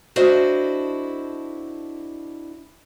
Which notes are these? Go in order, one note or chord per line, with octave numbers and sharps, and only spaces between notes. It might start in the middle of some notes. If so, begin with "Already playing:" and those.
D4 E4 F#4 A4 C5 D#5